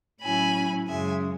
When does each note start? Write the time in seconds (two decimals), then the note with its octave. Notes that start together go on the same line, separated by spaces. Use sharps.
0.22 A2 F#3 C#4 E4 G#5 B5
0.88 F#2 C#3 G#3 E5 G#5